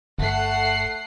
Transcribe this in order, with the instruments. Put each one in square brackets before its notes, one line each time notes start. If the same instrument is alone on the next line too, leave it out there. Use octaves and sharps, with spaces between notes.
[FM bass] G1 [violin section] A3 F#5 C7